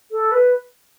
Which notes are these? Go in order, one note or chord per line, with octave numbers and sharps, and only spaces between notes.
A4
B4